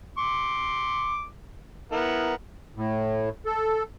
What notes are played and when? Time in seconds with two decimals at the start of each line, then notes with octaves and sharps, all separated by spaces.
0.18 C6 D6
1.92 B3 E4 A#4
2.77 A2
3.46 A4